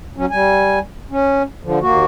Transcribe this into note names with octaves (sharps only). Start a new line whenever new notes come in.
F#3 C#4
G3 G#5
C#4
D3 F3
D#2 A#3 F#4